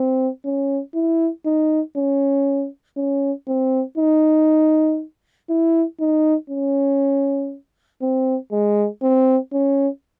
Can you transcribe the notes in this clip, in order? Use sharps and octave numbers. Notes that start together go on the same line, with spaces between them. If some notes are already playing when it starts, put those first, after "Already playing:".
Already playing: C4
C#4
E4
D#4
C#4
C#4
C4
D#4
E4
D#4
C#4
C4
G#3
C4
C#4